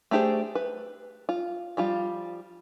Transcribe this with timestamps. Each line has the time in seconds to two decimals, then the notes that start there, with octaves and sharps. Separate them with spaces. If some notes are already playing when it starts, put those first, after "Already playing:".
0.11 A3 D4 G4 G#4 C5
0.55 B4
1.29 F4
1.77 F3 G3 F4